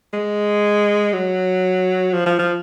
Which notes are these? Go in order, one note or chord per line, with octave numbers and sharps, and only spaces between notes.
G#3
F#3
F3
F3
F3